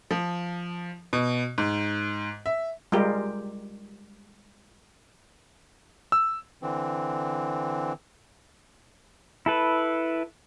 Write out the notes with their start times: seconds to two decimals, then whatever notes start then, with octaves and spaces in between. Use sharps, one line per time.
0.11 F3
1.13 B2
1.58 G#2
2.46 E5
2.92 G3 G#3 F4 G4 A#4
6.12 E6
6.62 D3 E3 C4
9.46 E4 A4 B4